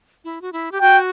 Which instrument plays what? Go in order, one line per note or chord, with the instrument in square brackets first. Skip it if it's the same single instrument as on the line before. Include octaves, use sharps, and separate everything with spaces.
[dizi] E4
F#4
E4
G4
[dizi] F#4 [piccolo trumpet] G5